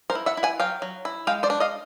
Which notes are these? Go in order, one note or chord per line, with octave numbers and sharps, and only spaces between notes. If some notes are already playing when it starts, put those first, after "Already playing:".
A#4 C5
E4
E5 F#5
E4
F#5 G#5
F#3 F5 G5
F#3
E4
G#3 F5 G5
C5 D5
D4
D#5 F5